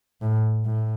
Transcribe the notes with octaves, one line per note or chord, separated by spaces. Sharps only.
A2
A2